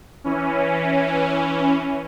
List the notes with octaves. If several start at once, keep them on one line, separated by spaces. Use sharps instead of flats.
E3 C#4